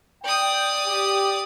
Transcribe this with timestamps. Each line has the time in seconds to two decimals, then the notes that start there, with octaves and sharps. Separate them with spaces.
0.24 D5 G5 D#6
0.86 G4